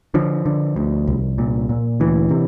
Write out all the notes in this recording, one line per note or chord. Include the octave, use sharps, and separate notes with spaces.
D3 F3
D3
D2
C2
A#2
A#2
D2 E3
C3